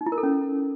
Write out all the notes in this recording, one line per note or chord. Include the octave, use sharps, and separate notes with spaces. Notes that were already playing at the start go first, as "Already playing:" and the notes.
D#4
E4
A#4
A4
C#4